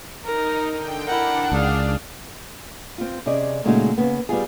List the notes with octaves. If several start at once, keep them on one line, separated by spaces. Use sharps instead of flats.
D#4 A#4
D3 G5
D4 E4 A#4 F#5
C#2 G#4 F5
C4 F4
C3 C#4 G#4 D5 D#5
A#2 C#3 G#3 A3 D#4 F#4
C#3 A#3 B3
G3 B3 F4 G#4